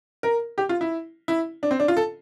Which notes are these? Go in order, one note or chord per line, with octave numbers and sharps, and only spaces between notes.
A#4
G4
F4
E4
E4
D4
C4
D4
F4
A4